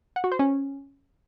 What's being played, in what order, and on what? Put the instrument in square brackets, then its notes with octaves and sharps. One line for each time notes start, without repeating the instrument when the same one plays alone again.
[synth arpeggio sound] F#5
F#4
C5
C#4